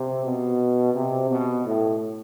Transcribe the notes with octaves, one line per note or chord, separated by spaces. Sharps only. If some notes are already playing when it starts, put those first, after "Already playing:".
Already playing: C3
B2
C3
B2
A2